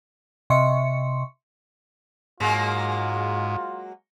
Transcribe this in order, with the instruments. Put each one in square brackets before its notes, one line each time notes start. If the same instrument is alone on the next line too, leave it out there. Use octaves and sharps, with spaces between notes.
[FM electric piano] C3 D#5 E5 C6 C#6 C#7
[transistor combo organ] G#2 [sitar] F#3 G#3 A#3 [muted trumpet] F4